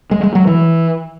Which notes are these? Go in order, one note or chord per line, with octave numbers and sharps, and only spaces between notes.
G#3
G#3
F#3
E3